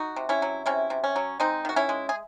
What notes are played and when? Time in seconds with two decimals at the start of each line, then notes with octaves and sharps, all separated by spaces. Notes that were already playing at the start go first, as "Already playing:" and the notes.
Already playing: D#4 F#4
0.16 C3
0.29 C#4 E4
0.42 F#3
0.66 C3 C#4 E4
0.90 C3
1.04 C#4
1.16 F#3
1.40 G#3 C4 D#4
1.65 D#3 F#4
1.76 C#4 E4
1.89 G#3
2.09 G#4